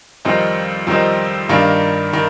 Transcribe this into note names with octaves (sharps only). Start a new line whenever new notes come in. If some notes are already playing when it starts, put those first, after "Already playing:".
F2 D#3 G3 C4 D#4
F2 D#3 G3 C4 D#4
G2 D#3 A#3 D4
D#3